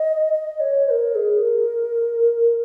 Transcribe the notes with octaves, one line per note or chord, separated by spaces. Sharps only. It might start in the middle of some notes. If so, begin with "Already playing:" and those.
Already playing: D#5
D#5
C#5
C5
A#4
G#4
A#4